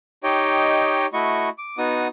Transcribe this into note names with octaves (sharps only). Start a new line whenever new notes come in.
D#4 G4 C#5 D#5 G5
A3 E4 F#4 D#5 C#6
D6
B3 D#4 F#4 D#6